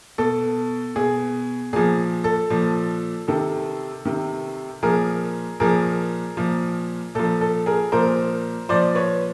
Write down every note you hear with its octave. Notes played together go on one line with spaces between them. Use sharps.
B2 A4
B2 G#4
A#2 F3 G#4
A4
A#2 F3
C3 D#3 A4
C3 D#3
A#2 F3 G#4 A#4
A#2 F3 G#4 A#4
A#2 F3
A#2 F3 A4
A4
G#4 A#4
A#2 F3 A#4 C5
A#2 F3 C5 D5
B4 C#5